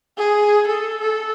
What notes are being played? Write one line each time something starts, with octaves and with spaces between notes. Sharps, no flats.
G#4
A4
A4